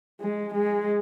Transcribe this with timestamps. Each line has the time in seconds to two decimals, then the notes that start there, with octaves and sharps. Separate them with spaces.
0.21 G#3
0.55 G#3